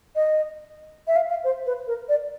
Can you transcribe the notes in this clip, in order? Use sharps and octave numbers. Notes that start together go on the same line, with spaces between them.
D#5
E5
F5
F5
C5
B4
A#4
D5